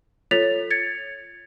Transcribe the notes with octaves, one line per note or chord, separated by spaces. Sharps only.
F4 A4 C#5 A6 B6 F7
G#6 A6 C#7